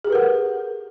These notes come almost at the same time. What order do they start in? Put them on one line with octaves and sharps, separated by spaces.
G#4 G4 B4 A#4 F#5